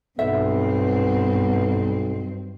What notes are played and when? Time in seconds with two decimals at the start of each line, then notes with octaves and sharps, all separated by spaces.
0.19 B1 G2 B3 C4 E5